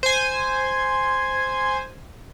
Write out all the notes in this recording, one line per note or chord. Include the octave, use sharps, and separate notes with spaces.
C5 G#5